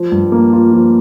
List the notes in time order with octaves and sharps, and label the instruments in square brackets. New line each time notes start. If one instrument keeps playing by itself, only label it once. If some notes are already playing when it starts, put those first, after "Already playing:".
Already playing: [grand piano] F3
G2
A#3
F4
F3